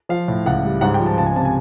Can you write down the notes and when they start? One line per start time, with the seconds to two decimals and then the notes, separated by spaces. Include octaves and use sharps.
0.09 F3 F5
0.28 A2
0.46 C#2 F#5
0.64 G3
0.81 G#2 F#5
0.94 G5
0.99 F3
1.06 A5
1.17 C#2 A5
1.26 G#5
1.36 C3 A5
1.45 G#5